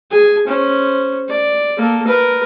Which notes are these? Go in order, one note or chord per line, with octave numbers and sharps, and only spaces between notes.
G#4 G#5
C#4 C5
D5
A#3 A4
A#4 B4